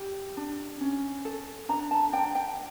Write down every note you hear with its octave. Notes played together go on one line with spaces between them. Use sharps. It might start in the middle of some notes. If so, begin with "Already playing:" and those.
Already playing: G4
D4
C#4
A4
D4 A#5
A5
D4 G5
G5